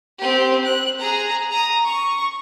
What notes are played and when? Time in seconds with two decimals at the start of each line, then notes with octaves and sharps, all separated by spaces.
0.18 C4 G4
0.64 F#6
0.98 G#4 A#5
1.51 A#5 D#6
1.83 C#6